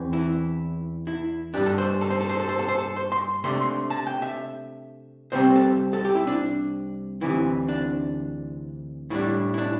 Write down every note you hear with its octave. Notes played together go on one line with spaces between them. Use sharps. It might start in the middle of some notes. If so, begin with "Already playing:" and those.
Already playing: E2 E3 C4
E4
E4
G2 G3 D4 G4
A4
C5
A4
C5
A4
C5
A4
C5
A4
C5
A4
C5
C6
C3 A3 D4 C6
C6
A5
G5
E5
C2 C3 G3 C4 C5
A4
A4
G4
E4
D4
D2 C3 E3 E4
D4
A2 G3 D4 E4
E4
D4